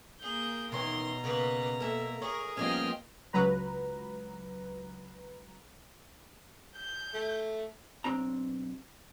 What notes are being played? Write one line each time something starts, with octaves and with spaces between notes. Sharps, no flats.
A#3 G#4 A#4 G6
B2 D#3 E3 C#4 A#5 C6
C#3 A#3 B4
A#3 A4 E5
G#4 A#4 C#5
F3 G3 A#3 B3 C#4 D#5 G5 F6
C#2 F#3 B4 A#5
G6
A3
B1 F#2 C4 D4 A#5